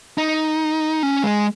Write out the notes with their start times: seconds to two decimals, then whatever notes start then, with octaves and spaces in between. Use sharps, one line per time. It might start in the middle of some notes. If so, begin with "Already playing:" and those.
0.18 D#4
1.03 C#4
1.23 G#3